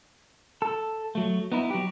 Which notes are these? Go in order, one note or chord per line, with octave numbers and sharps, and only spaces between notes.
A4
F#3 A3
B3 D#4 E4
F#3 G4